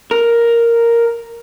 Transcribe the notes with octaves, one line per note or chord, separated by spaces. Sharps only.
A#4